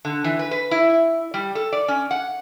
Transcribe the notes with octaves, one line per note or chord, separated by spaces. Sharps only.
D3
E3
B4
B4
E4
G3
A4
D5
C#4
F#5